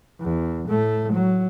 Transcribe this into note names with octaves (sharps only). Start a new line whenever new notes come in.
E2
A2 A3
F#3